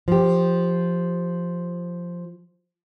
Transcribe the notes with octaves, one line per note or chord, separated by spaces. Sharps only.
F3 G4